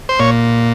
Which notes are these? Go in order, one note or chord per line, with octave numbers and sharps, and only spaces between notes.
C5
A#2 C#5